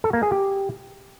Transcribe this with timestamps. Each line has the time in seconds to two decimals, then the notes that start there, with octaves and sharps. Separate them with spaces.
0.04 A4
0.13 A#3
0.23 G#4
0.32 G4